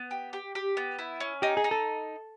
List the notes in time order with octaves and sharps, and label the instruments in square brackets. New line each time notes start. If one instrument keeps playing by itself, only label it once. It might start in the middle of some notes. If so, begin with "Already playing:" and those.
Already playing: [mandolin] B3
G4
G4
G4
B3
E4
C#4
[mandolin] D#4 [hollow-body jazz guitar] G4
[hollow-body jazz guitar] G#4
[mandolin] D#4
[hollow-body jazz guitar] A4